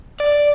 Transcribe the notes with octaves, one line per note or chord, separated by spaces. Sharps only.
D5